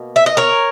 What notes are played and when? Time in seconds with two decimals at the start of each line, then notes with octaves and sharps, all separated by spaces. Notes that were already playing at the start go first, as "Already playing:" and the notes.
Already playing: B2 A#3
0.16 E5
0.26 D#5
0.37 A#4 C#5